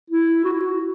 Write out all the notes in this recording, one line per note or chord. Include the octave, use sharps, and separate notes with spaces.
E4
F#4
E4
F#4